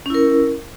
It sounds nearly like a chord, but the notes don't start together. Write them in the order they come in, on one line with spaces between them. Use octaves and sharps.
C#4 E4 A#4